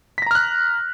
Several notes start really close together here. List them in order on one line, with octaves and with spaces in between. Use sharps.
B6 A#6 A#5 F6 F#6